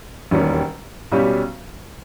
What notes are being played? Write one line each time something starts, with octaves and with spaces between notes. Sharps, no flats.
E1 D#2 D#3 G3 C#4
B1 B2 G3 C#4 G4